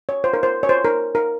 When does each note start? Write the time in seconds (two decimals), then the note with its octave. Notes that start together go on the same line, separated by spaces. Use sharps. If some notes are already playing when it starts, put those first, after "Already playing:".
0.09 C#5
0.24 C5
0.33 A#4
0.43 C5
0.63 C#5
0.69 C5
0.85 A#4
1.15 A#4